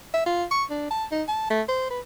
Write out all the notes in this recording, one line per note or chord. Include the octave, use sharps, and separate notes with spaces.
E5
F4
C#6
D4
A5
D#4
A5
A3
C5
B4